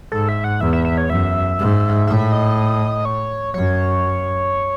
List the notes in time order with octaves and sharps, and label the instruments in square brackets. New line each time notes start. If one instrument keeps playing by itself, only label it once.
[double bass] G#2 [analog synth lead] A4
[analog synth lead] E5
F#5
[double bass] E2 [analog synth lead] E5
[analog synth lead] E5
E5
C#5
[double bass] F#2 [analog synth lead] E5
[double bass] G#2
[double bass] A2 [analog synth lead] E5
[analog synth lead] D#5
C#5
[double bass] F#2 [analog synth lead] C#5